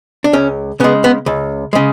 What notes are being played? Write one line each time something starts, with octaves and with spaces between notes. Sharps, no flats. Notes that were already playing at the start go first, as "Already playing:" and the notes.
D4
C#2 C#4
C#3 G#3 B3
B3
C#2
C#3 G#3